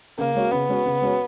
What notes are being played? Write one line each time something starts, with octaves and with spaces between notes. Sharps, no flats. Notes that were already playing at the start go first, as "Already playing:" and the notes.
C#3 A#3
G#3 C#4 F#4 C#5
C#3 B3
G#3 C#4 F#4 C#5
C#3
G#3 C#4 F#4 C#5